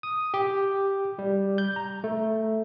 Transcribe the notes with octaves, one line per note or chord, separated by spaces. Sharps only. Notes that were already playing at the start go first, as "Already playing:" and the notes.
D#6
G4
G3
G6
A#5
A3